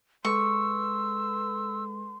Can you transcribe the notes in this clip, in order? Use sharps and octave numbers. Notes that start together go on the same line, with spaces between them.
G#3 A4 B4 C6 C#6 E6